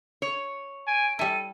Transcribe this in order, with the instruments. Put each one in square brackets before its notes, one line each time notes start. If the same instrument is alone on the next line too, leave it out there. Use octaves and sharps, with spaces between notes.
[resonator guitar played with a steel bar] C#5
[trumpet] G#5 [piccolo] D7
[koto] G3 E4 [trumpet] A4 [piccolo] D#7